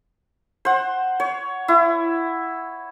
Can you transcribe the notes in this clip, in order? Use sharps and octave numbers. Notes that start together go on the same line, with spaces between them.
C5 F#5
C#5
E4